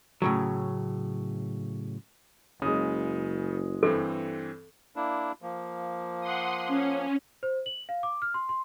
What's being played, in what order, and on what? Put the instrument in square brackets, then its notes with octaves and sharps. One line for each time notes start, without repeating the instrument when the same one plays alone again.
[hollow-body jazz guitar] A2 C#3 F#3
[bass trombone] F#1 [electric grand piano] C#3 [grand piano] G#3 D#6
[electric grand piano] G2 E3 C4 [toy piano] A4
[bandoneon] A#3 D4 E4
F3 A#3
[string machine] F#5 C6 D#6
C#4
[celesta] C5
F#7
F5
D6
F6
C6
C6